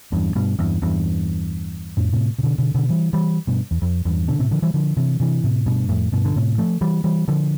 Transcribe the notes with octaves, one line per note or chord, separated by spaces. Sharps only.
E2 G2
G2 B2
E2 G2
E2 G2
F2 A2
A2 C3
C3
B2 D3
B2 D3
B2 D3
E3 G3
E3 G3
G2 B2
E2
F2
E2 G2
B2 D3
A2 C3
D3 F3
E3 G3
D3 F3
C3 E3
C3 E3
A2 C3
G2 B2
F2 A2
G2 B2
D3
A2 C3
F3 A3
E3 G3
E3 G3
D3 F3